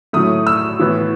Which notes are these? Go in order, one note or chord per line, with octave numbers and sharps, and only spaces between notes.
A2 F#3 A3 D#6
E6
A2 E3 B3